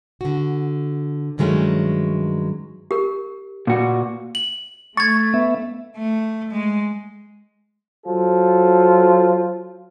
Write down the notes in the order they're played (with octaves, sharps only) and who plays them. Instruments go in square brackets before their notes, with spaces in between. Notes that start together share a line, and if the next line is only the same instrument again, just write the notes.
[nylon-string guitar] D3 F#4
G2 D#3 F#3 G#3 A3 C#4
[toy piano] G4 A#4
[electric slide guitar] A#2 F#4
[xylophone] F#7
[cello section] A3 [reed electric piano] C#6 [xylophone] G#6 A6
[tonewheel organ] B3 E5
[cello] A3
G#3
[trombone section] F#3 F4 A4 C5